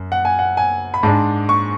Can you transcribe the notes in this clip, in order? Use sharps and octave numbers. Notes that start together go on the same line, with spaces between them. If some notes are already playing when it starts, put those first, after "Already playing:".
Already playing: F#2
F#5
G#5
F#5
G#5
B5
G#2 G#3 D4 A5
C#6